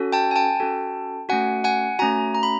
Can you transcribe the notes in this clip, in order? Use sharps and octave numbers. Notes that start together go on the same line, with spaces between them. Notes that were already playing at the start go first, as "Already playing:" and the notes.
Already playing: C#4 F#4 A4
G5 A5
G#5
G5 A5
C#4 F#4 A4
A3 C#4 F#4 F#5 G#5
F#5 G#5
A3 C#4 F#4 G#5 A#5
A#5
B5